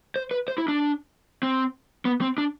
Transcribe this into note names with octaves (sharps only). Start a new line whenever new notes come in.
C5
B4
C5
E4
D4
C4
B3
C4
D4